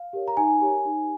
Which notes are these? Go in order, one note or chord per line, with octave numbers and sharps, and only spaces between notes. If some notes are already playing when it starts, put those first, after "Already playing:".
Already playing: F5
G4 A#4 C#5
A#5
D#4 G#5
G4 A#4 C#5
D#4